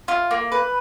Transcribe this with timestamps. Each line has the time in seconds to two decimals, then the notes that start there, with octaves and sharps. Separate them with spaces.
0.08 F4
0.31 A#3
0.52 B4